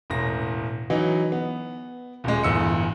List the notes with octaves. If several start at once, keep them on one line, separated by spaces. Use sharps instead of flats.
E1 A1 A#6
E3 F#3 D#4
B3
D#1 G#3
D1 G1 E2 E6 C#7